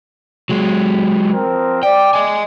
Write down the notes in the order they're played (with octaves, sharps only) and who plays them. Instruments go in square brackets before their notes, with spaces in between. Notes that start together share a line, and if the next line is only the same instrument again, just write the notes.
[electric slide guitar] F#3 G#3
[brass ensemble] F3 C4 A#4
[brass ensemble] D5 [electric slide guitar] G5
[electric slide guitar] D#5 G#5